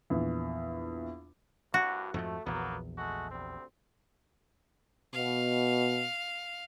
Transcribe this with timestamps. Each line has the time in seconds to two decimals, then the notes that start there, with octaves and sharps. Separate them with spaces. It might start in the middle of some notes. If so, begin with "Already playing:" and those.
0.10 A#1 E2
1.74 C2 G2 F#4
2.14 F2 G#2 F3 A3
2.46 A#1 E2 F#3 A#3 B3
2.97 G#3 A3 F#4
3.31 D2 G3 C4
5.13 B2 F5